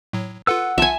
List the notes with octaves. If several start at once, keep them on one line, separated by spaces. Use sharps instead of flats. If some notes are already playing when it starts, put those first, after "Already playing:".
A2 F#3
F4 A4 B4 F#5 E6
B1 F4 E5 G#5 A5